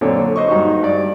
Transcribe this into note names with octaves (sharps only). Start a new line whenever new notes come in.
F#2 A#2 D3 C4 A4 C#5
C5 D#5 C#6
G2 D#4 F#4
G2 D5